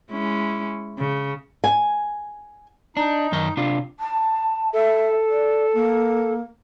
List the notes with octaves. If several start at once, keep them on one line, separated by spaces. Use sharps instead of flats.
G#3 C#4 E4
C#3
G#5
D4 D#4
F#2 D#3 D#5
C3 D4 F4
A5
A4 E5
D5
A#3